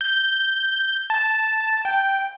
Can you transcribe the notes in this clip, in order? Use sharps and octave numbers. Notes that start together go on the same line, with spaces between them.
G6
A5
G5